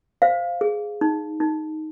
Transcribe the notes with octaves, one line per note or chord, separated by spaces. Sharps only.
C5 F5
G#4
D#4
D#4